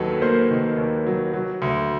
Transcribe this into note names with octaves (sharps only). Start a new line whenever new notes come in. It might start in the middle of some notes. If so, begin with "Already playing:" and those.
Already playing: D#2 D#3 F#3 A4 B4
A#3 A#4 C5
D#3
D#2
F#3
F#3
D2